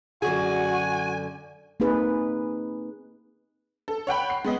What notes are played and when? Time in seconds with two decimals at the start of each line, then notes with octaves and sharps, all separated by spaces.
0.22 F#2 D3 F#4 G#4 G#5
1.80 A#3 C4 D#4 G#4 B4
3.88 A4
4.07 C#5 F#5 G5 B5
4.30 C7
4.44 G#3 B3 D#5